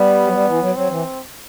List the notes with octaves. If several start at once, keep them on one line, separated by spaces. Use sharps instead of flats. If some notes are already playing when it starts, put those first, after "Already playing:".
Already playing: G3 B3
F#3
G3
E3
F#3
F#3 C4
E3